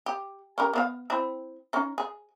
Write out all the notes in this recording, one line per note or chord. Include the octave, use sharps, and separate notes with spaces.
G4
C#4 G4 A#4
B3 C4 F5
C4 E4
C#4 D#4
G#4